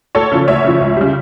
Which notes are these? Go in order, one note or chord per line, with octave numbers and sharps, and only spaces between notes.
D2 A4 C#5
C#3 F3
D2 C#5 E5
C#3 F3
C#2
C#3 G3